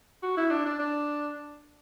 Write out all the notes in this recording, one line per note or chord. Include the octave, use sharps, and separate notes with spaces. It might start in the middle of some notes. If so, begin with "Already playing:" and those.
F#4
E4
D4
D4
D4